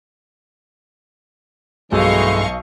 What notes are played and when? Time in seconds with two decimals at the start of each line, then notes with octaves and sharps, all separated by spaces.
1.92 B1 G2 E3 G#3 A3 D#5 F5 C#6